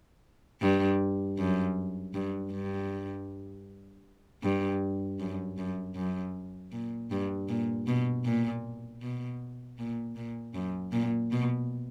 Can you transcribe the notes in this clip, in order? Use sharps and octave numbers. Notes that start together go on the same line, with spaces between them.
G2
F#2
G2
G2
G2
F#2
F#2
F#2
A#2
G2
A#2
B2
A#2
B2
A#2
A#2
F#2
A#2
B2